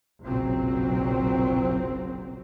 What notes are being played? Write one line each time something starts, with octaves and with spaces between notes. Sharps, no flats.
F#1 B1 A#2 F#3 C4